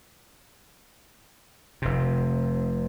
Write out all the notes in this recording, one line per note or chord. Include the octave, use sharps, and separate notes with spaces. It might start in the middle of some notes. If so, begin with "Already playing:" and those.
F1 C3